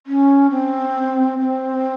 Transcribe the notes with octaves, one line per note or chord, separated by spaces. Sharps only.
C#4
C4
C4